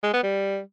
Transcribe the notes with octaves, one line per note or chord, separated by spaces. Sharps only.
G#3
B3
G3